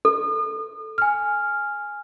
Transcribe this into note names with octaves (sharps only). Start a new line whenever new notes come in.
A4
G#5 F6